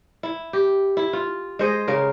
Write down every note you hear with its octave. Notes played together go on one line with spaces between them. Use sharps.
E4
G4
E4
F4
G#3 C5 D#5
C#3 A#4